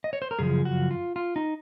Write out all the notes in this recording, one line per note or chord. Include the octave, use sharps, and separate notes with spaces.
D#5
C#5
C5
A#4
F#2 C#3 F3 G#4
F#4
F4
F4
D#4